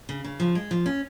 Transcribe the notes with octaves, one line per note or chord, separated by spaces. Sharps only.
C#3
C#3
F3
G#3
F3
C#4